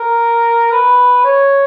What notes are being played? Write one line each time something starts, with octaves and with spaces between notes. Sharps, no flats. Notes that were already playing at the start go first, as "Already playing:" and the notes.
Already playing: A#4
B4
C#5